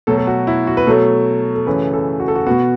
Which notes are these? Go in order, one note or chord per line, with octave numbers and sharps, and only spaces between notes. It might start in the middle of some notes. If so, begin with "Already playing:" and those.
B2 F#3 A3 A4
A4
F#4
E4
F#4
B4
B2 F#3 A3 A4
A4
F#2 C#3 E3 A3 B4
A4
F#4
A4
F#4
B2 B3 F#4